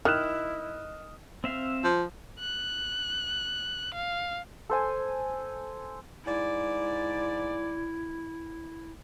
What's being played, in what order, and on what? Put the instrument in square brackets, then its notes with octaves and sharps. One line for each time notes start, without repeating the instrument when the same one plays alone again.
[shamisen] D#3 [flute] E4 [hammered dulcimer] D#5 [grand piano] F6 F#6 E7
[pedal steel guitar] C4 E5 F5
[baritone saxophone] F3
[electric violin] F#6
F5
[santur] A4 C5 G#5
[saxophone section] G#2 D5 [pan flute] E4